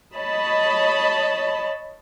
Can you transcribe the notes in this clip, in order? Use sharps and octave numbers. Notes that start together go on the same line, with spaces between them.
C#5 D#5 A5 B5